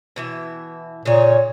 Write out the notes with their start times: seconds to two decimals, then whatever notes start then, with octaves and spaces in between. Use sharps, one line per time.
0.16 B2 E3 E5
1.05 A#2 C#3 D#4 C#5